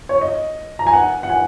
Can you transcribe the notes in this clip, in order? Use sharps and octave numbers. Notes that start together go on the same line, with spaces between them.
C#5
D#5
A#5
G#5
F#5
F#5
G#5